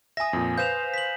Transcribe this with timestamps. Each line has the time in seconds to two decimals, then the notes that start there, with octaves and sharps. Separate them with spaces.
0.17 E5 G#5 D#6 A#6
0.33 F2 A#2
0.58 B4 C5 F5 G6 E7 F7
0.94 B6 F#7